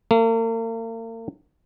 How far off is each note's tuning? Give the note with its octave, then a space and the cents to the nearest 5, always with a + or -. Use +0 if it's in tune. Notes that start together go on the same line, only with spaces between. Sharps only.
A#3 -45